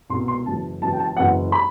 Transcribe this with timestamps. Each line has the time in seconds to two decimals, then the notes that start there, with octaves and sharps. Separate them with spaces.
0.10 C2 B2 C6
0.28 C6
0.46 F#1 F#2 E3 A5
0.81 F#1 F#2 E3 A5
0.93 G5
0.99 A5
1.17 F#1 F#2 E3 F#5
1.52 B5